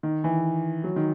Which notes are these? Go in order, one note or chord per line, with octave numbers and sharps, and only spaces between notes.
D#3
E3
F#3
D#3